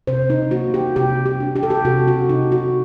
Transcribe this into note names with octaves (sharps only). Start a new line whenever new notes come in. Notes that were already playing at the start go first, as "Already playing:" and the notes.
C3 C5
D#4
A#3 F#4
G4
C3 G4
G4
D4
G4
A4
G4
C3 F#4
F#4
C3 D#4
F#4